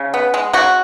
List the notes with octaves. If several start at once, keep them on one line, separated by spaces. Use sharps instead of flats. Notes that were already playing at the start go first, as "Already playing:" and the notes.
Already playing: C#3
B3
G#3
C#3 F#4